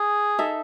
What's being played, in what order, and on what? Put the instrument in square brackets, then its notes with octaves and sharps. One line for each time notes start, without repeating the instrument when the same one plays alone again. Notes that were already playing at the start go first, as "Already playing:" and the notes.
Already playing: [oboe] G#4
[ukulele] D#4 A4 E5